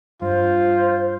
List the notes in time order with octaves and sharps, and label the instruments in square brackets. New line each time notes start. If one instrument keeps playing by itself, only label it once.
[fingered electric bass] G2 [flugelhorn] F4 [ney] C5